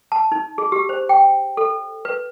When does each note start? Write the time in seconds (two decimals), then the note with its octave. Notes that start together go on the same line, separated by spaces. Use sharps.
0.12 A5
0.32 D#4
0.58 G#4
0.72 G4
0.89 C5
1.09 G5
1.57 A4
2.05 B4